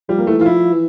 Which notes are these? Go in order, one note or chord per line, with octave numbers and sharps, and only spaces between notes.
F3 G3
A#3
E3 A3
E3
F4
F3 E4
E3